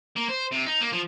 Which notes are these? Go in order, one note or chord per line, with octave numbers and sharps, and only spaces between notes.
A#3
C5
C3
D#4
A#3
F3